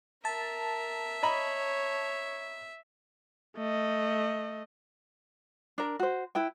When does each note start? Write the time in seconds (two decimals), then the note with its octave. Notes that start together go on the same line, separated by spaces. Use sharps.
0.25 A#4 E5 A5
1.23 C#5 D#5 A#5 B5
3.57 A3 D#5
5.78 D4 A#4
5.99 F#4 C5
6.35 E4 B4 G5